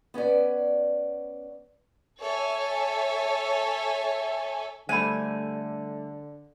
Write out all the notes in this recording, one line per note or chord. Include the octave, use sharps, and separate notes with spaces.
B3 C#4 B4 D5
A4 C#5 E5 G#5
D3 G3 A3 D4 C5 G#5 B5